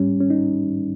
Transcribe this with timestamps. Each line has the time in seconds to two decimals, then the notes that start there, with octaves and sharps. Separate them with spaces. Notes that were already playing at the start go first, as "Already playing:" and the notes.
Already playing: G#2 G3 C#4
0.21 C#4
0.30 D#4